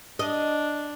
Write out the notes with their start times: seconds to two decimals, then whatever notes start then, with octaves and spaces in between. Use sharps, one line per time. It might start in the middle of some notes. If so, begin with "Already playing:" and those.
0.19 D4 D#5